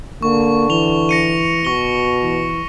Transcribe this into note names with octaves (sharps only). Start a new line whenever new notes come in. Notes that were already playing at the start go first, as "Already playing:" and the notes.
D3 A#3 C#6
E3 F7 G7
A#6 C#7 D#7
B2 C#6 G7
E3